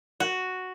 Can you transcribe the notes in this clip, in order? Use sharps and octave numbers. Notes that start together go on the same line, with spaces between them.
F#4